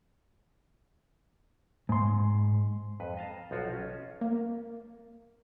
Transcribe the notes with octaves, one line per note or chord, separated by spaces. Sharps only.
G#2 C6
F2 B4
D#5 F5 A5 A#5
B1 F3 F4 F#4 C#5
C#4
A#3